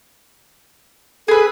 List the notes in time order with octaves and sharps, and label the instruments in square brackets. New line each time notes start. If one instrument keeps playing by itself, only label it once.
[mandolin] G#4 B4 [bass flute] A4